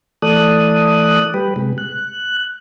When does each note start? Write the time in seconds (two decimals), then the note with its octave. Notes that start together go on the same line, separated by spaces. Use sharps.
0.22 E3 A3 A4 D5 D#6 F#6
1.34 G3 G4 B4
1.56 C3 G#3
1.78 F#6